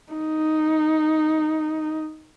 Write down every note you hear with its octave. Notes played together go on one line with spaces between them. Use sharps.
D#4